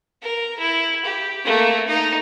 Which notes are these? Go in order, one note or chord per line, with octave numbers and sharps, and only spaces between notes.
A#4
E4
G4
A3 A#3
D#4